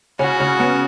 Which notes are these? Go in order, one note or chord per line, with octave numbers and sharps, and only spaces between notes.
C#3 C#4 F#4
C#3 C#4
B3